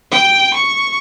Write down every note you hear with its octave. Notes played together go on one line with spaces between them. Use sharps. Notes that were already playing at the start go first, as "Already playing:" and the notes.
G5
C#6